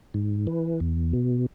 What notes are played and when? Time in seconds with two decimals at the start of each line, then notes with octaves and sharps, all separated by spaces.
0.14 G#2
0.47 E3
0.80 E2
1.13 B2